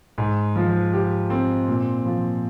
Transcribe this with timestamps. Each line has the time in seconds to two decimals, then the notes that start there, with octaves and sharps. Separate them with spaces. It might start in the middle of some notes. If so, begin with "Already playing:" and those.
0.18 G#2
0.55 F3
0.93 G4
1.30 C4
1.68 A#2
2.05 F3